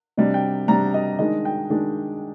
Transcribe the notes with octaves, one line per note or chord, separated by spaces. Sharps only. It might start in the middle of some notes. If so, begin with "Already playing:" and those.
C3 G3 D4 D#5
G5
C3 G3 D4 A#5
D#5
D#3 G#3 D4 D#5
G5
D#3 G#3 D4